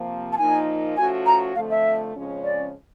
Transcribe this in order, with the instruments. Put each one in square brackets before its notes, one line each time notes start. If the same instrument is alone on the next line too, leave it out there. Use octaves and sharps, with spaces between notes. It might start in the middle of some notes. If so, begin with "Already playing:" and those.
Already playing: [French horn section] C3 F3 A#3
[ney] A5
[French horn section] A#2 F3 A#3 D#4 [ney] G#5
[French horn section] F3 A3 C#4 F#4 [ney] G#5
[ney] A#5
[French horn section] F2 D3 F3 A3 [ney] F5
[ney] E5
[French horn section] F2 C#3 F3 G#3 C#4
[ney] D5